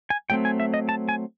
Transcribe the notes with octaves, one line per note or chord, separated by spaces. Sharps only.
G#5
F#3 A3 C4 G5
G#5
E5
D#5
A5
G#5